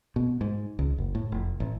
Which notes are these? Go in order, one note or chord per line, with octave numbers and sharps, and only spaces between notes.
B2
G#2
C#2
F#1
A2
F1
A1